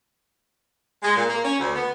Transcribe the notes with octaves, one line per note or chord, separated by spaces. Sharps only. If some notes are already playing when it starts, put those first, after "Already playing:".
G#3
A#2
A#3
C#4
D2
B3